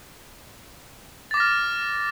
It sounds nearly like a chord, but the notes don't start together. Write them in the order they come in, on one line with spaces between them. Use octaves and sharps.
A6 D6 A#6 F6